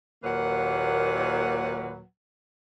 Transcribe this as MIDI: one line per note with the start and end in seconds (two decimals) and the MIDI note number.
0.24 2.03 39
0.24 2.03 46
0.24 2.03 54
0.24 2.03 58
0.24 2.03 71
0.24 2.03 78